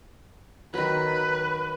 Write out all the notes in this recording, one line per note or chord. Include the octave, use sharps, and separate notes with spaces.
D#3 F#3 B4